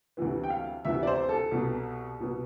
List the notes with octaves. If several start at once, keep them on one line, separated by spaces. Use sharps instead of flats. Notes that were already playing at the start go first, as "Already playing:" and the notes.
D2 C3 E3 B3
G5
F5
D2 C3 E3 B3 E5
D5
C5
A4
C2 B2 B3
C2 B2 B3